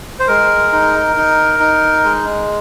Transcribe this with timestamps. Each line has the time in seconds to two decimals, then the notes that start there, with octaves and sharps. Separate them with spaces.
0.20 C5
0.28 G#3 A#4
0.72 D#4
1.16 D#4
1.60 D#4
2.04 G#3